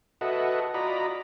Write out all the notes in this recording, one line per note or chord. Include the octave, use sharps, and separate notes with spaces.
F#4 A4 B4 D#5 E5 F#5
F4 F#4 D5 D#5 A#5 B5